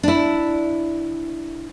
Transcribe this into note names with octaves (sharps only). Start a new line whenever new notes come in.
D4 E4